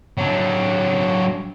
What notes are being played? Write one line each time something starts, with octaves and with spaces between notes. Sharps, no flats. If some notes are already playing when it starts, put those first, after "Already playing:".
F#3 D4